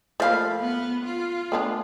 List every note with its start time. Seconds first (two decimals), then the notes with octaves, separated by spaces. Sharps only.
0.20 F3 A3 A#3 F5 B5
0.60 B3
1.05 F4
1.52 A3 B3 D4